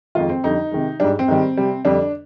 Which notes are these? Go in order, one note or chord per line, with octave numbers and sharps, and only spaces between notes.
F2 D#3 G#3 F4
C4
F2 D3 G3 D#4
C3 D#3 G#3
G#2 G3 D4
C4
G#2 D#3 G3
C3 G3
F2 D3 G3 D4